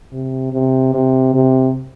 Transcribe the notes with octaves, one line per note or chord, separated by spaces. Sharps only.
C3
C3
C3
C3